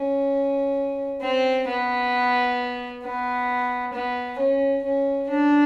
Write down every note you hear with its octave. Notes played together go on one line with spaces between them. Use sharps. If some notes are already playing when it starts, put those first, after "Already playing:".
Already playing: C#4
C4
B3
B3
B3
C#4
C#4
D4